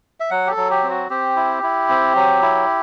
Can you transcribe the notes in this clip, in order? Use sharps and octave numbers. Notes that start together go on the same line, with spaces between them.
E5
F#3 F#5
G4
A4
F#3
G4
C4
F#4
C4 G4
E4
E4
C4
F#3
E4